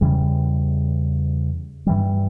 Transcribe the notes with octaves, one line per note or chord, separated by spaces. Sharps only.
E2 C#3 E3 G3
G2 E3 G3